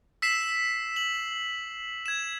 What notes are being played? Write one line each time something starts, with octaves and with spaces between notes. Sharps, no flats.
E6 B6 C7 E7
F#7
G#6 E7